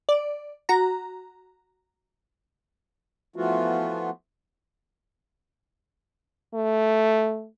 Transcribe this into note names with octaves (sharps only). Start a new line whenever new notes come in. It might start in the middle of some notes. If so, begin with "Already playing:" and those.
D5
F#4 A#5
E3 F3 A3 B3 F4 F#4
A3